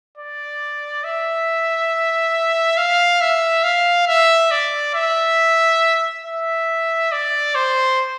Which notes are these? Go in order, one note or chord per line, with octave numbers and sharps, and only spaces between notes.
D5
E5
F5
E5
F5
E5
D5
E5
E5
D5
C5